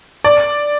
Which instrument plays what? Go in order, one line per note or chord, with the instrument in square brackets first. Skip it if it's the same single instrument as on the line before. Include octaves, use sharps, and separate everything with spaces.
[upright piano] D5